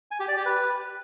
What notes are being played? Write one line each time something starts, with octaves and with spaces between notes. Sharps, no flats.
G#5
G4
D5
G4
B4